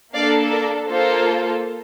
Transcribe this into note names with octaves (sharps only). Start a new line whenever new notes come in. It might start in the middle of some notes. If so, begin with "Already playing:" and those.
A#3 D4 A4 D5 F5
A#4 D5
A#3 F4 A4 C5